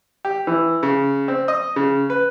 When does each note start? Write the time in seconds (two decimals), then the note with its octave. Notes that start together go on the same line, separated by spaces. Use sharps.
0.25 G4
0.47 E3
0.83 C#3
1.28 C4
1.48 D#5
1.76 C#3
2.10 B4